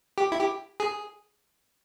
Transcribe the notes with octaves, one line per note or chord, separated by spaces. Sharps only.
G4
E4
G4
G#4